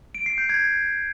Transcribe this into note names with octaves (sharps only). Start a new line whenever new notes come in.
D7
C7
G6
G#6